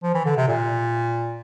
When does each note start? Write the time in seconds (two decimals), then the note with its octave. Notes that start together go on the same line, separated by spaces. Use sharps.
0.03 F3
0.14 E3
0.25 D3
0.37 C3
0.48 A#2